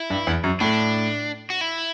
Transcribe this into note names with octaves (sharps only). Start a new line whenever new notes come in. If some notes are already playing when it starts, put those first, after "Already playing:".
Already playing: E4
G2
E2
F#2
A2 D4
F#4
E4